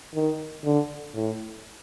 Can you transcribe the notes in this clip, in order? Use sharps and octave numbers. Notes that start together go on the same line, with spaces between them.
D#3
D3
A2